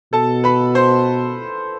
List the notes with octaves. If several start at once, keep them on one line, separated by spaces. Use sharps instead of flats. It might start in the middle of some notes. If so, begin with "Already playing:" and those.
B2 A4 A5
B4 B5
C5 C6